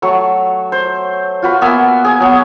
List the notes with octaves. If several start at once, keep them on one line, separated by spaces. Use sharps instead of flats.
F#3 A3 C#6
C5
F4 F#4 B4
A#3 B3 E5 G#5
G#4 G#5
F#3 B3 F#4